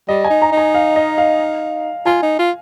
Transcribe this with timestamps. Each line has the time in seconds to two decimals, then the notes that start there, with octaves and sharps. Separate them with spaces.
0.08 G3 D#5
0.25 G#5
0.30 D#4
0.42 A#5
0.52 D#4
0.57 G#5
0.75 F5
0.96 D#5
1.18 F5
2.06 F4 G#5
2.23 D#4
2.39 F4